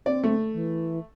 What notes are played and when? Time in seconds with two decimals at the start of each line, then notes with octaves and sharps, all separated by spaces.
0.06 C4 D5
0.24 A3
0.53 E3